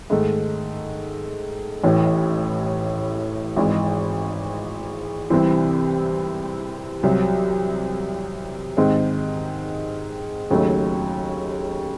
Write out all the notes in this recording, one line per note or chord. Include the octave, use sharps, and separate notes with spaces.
G#2 D#3 A3
A1 A2 E3
G#1 G#2 E3 G#3
C2 C3 E3 C4 E4
C2 C3 F#3
G#2 D#3 G#3 C4
D#2 C#3 F#3 A3 D#4